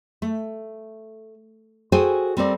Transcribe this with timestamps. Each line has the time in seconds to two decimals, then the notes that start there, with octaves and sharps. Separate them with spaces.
0.22 A3
1.92 F#4 G#4 A4 C5 G5 G#5
2.37 G3 C4 A4 A#4 D5